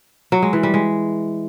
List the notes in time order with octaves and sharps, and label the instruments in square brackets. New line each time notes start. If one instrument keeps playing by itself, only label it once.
[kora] F#3
G#3
E3
G3
G#3